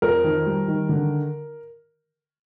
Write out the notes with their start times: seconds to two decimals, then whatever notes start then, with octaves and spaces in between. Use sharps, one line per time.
0.02 F2 A#4
0.24 D#3
0.46 G3
0.68 D#3
0.89 D3